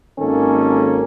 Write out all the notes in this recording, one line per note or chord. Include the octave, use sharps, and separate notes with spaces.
G#1 D#3 A#3 C#4 A4